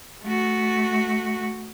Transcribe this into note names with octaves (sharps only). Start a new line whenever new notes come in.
A3 F#4